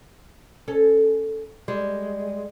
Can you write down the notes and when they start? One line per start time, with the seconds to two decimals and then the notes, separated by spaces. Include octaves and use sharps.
0.68 C#4 A4
1.68 G3 G#3